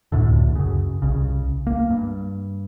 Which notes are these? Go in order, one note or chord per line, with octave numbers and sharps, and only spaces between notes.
C#2 F#2 A2 D3
F#2 C#3
C2 C#3
A#3
G2